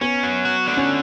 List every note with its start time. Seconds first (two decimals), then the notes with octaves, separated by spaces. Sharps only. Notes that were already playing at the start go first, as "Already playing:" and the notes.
0.01 B3 C#4
0.23 F#3
0.45 F#4
0.67 D3
0.77 C#4